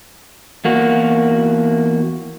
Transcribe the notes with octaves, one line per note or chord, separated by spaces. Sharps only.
E2 A#3 F#4